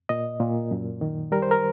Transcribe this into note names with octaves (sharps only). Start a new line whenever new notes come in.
A#2 D#5
A#2
F#2
D#3
G3 A#4
C5
A#4